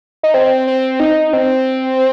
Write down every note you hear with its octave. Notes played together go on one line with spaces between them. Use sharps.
D#4
C4
C4
D#4
C4